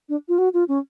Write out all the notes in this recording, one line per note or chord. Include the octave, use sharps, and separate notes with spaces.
D4
F4
F#4
F4
C#4